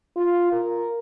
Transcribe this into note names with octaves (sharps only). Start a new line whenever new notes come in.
F4
A#4